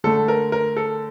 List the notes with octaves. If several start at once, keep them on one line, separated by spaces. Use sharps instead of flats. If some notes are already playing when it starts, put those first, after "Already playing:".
D3 A3 A4
A#4
A#4
A4